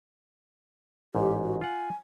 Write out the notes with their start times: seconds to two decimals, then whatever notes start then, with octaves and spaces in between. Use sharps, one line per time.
1.15 A1 G#2 G4
1.43 F#4
1.61 F4 F#5 G#5